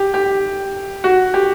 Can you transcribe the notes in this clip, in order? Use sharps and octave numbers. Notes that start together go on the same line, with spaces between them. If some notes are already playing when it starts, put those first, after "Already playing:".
Already playing: G4
G4
F#4
G4